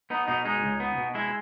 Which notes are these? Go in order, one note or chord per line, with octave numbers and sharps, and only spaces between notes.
B3 D#4
B2 D#4
G#3 D#4
C#2
B3
B2
G#3 E4